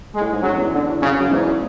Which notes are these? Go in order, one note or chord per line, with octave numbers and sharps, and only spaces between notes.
G#3
A2
G#2
F#2 F#3
E2
D3
E2
F#2 C#3
F#2
E2 G#2